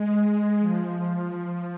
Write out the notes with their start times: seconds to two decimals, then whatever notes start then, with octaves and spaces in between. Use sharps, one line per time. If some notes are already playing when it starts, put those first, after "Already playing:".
Already playing: G#3
0.60 F3